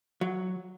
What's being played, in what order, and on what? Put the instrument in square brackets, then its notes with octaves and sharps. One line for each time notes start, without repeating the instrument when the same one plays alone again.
[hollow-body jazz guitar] F#3